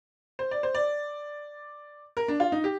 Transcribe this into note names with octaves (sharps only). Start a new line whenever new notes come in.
C5
D5
C5
D5
A#4
D4
F4
D#4
G4